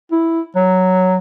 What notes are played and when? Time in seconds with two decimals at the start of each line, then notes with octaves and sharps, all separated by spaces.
0.12 E4
0.56 F#3